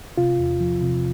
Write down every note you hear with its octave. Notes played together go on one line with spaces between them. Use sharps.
C3 F4
E2
F3
C3